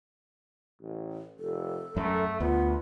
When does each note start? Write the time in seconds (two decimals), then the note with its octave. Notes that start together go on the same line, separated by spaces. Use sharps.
0.81 A1
1.39 F1 A4
1.96 F#2 A3
2.40 D2 B3 F4